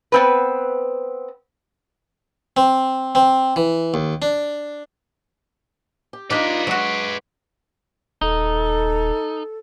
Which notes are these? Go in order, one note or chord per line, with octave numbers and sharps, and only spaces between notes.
B3 C4 B4
C4
C4
E3
D#2
D4
G4
D4 D#4 F4 G4 B4 D5 D#5
F#3 G#3 F#4
D#1 D#4 A4